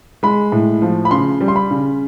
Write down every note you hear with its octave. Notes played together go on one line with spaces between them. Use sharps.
G#3 B5
A2
F3
B5
C#3 C6
G3
C6
B5
C#3